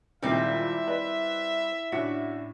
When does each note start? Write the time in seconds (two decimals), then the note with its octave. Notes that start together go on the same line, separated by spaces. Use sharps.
0.22 D#2 A#2 G3 G#3 C4 E4 E5
0.88 B4 D5 D#5 B5
1.92 A2 C#4 D4 F#4